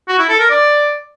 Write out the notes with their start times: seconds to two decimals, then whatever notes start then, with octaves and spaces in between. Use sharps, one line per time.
0.08 F#4
0.19 E4
0.29 A4
0.40 A#4
0.50 D5